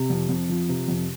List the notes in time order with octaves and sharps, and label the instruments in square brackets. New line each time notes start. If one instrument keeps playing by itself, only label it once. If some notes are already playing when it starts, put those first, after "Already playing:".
Already playing: [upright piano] C3
F2
F2
F3
C3
F2